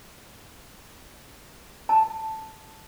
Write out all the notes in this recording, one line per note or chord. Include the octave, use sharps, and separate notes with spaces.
A5